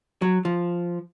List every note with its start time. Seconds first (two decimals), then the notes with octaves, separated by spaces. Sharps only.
0.22 F#3
0.45 F3